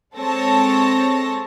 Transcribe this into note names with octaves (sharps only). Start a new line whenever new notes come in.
G#3 C4 A4 C#5 A5 A#6